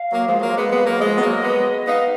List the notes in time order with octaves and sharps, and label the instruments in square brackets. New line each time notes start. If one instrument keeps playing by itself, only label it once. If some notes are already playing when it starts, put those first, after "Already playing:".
Already playing: [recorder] F5
[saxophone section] F#3 A#3
F3 G#3
F#3 A#3
G#3 B3
G#3 B3
F#3 A#3
[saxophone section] F3 G#3 [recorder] D#5
[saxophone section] B3
F#3 A#3
G#3 B3
[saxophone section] B3 D#4 [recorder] F5